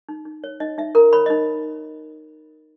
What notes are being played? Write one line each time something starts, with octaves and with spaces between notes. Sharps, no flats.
D#4
D#4
C#5
D#4 D#5
D#4 E5
A#4 A#5
C#5 B5
D#4 D#5